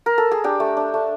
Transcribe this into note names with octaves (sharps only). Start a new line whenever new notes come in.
A#4
A4
G#4
D4 G4
A3
D4
A3